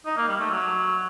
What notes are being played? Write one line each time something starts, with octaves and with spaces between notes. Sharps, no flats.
D#4
A#3
G3
A3
F#3